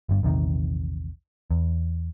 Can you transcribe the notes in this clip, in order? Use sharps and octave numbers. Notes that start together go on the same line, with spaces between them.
G1 G2
A#1 E2 C3 D#3
E2